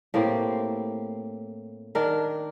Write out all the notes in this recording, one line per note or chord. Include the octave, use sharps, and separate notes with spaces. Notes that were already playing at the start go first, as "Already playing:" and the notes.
A2 A#3 C4 G4
D#3 D4 A#4